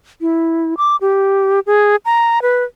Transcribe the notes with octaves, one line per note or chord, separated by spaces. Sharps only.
E4
D6
G4
G#4
A#5
B4